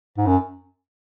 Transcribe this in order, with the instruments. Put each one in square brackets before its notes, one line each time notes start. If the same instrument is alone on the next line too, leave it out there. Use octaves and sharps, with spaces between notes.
[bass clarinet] G#2
F#2